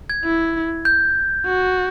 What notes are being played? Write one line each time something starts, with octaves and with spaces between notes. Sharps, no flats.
G#6
E4
G6
F#4